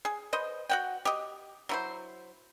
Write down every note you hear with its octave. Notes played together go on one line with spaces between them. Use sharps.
G#4
B4 C5 D#5
F#4 F#5 G5
G4 D#5
F#3 E4 C5